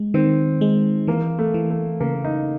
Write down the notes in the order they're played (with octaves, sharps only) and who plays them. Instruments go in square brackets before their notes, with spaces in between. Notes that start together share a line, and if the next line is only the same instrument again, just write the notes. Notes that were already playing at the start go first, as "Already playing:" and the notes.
Already playing: [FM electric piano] G#3
[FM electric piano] D#3 [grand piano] C4
[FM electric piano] G#3
[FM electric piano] E3 [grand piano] A#3
[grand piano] A3
[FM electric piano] E3
[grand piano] A3
[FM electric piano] C#3 [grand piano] A#3
[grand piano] D#4